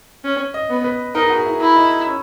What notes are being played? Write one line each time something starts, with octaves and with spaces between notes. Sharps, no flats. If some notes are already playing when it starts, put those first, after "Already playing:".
C#4
D#5
B3
B4
D#4 A#4
G#4
F#4
G#4
E4
E4
D#4
C#4